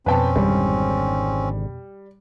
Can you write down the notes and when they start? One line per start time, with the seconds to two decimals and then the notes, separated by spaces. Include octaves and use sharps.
0.06 F2 B2 C4 C#4 B4 G5 A5
0.36 G#1 G#2 D3 G3